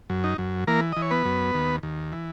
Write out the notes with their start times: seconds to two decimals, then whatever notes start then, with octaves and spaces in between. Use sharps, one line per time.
0.10 F#2
0.24 D#4
0.38 F#2
0.67 E3 A#3 A#4
0.92 E3 D#5
1.02 C#5
1.11 B3 B4
1.25 F#2
1.54 D#2
1.83 D#2
2.12 E3